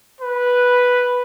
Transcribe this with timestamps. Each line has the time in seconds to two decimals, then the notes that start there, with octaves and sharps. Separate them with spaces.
0.21 B4